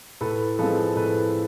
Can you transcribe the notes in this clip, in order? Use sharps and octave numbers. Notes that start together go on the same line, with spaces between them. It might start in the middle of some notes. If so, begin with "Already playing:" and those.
A2 A4 B4
F3 G#3 C4 A4 B4
A2 A4 B4